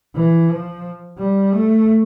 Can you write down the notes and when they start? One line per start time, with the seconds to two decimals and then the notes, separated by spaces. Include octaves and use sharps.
0.15 E3
0.49 F3
1.18 G3
1.53 A3